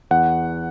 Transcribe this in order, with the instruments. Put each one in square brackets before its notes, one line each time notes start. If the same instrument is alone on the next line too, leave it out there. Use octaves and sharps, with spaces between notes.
[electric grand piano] E2 F#5